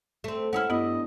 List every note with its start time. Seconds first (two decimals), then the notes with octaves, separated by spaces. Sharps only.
0.24 A3 C4
0.53 C#4 D#4 E4 F#5 E6 F6
0.70 G2 B3 E4 D#5